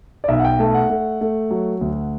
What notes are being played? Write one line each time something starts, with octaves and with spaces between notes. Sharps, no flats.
D5
B1 E5
F#5
G5
A3 A5
F#5
A3
A3
F#3
D2